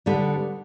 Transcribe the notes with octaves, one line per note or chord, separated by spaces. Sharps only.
D3 G3 B3